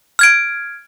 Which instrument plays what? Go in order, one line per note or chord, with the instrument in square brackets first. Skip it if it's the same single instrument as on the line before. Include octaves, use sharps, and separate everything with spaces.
[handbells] F6 G#6 D7